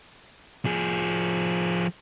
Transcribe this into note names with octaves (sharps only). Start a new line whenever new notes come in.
F3 G#4